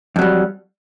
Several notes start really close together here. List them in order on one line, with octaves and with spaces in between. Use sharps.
F2 F#3 G3